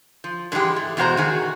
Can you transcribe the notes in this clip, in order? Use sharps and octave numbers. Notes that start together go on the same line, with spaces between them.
F3
G#2 D3 E3 G#3 G4
A3
E2 B2 G#3 F#4 C5 A#5
D#3 F#4 G#4